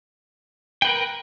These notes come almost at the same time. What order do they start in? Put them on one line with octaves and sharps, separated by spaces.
G5 B4 A#4